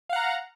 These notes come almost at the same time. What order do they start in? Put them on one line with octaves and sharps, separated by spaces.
F5 F#5 A#5